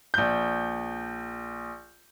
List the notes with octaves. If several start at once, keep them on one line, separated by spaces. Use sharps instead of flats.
A#1 G6